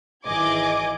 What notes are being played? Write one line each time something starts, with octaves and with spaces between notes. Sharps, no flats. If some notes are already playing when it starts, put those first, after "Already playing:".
G#1 E3 G#4 D#5 D6 G#6